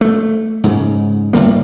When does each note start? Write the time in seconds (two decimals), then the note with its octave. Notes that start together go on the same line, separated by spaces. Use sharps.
0.01 A3
0.64 G#2 C#3
1.33 G1 A2 G3 A#3